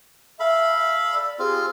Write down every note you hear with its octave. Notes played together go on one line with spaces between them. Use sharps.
A4 E5 F5 B5
D5 E6
C4 F4 G4 G#4